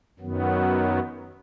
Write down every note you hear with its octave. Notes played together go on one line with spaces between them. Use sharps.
F#2 D#3 F#3 B3